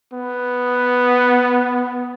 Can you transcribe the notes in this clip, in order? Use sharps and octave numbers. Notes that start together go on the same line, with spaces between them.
B3